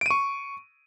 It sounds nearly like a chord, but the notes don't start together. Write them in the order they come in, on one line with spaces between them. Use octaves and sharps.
D7 D#7 C#6